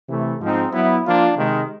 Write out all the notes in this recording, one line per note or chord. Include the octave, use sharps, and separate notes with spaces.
C3 E3 A3
G#2 F3 G#3 C4 D#4
F#3 B3 E4
F3 A#3 D4 F4
C3 D#3 G#3